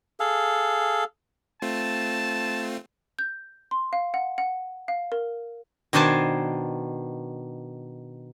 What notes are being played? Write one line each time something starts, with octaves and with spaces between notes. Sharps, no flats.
G#4 A4 F5
A3 C4 F4 A5
G6
C6
F5
F#5
F#5
F5
A#4
B2 D#3 D4 C5 G#5 A5